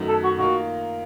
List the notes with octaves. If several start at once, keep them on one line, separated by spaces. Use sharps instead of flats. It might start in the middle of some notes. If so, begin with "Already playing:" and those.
Already playing: F#2 D#3 A3
A4
F#4
D#3 A#3 F4 F#4